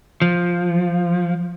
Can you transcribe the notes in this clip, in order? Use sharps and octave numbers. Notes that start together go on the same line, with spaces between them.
F3